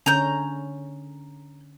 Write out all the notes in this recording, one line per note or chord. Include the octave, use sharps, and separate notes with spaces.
D3 C#4 A#5 G6